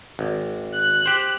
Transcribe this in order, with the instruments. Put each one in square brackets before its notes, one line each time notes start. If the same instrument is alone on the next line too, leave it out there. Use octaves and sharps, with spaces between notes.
[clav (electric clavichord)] G#1
[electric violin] F#6
[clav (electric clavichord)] G4 C5